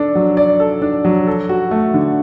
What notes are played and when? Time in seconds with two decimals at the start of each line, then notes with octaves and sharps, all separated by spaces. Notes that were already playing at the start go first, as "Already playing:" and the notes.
Already playing: D4 A4
0.15 F#3
0.37 D5
0.60 A4
0.82 D4
1.05 F#3
1.27 A4
1.49 F#4
1.71 A3
1.94 D3